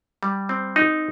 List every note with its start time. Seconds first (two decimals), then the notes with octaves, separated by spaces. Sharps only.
0.23 G3
0.49 C4
0.76 D#4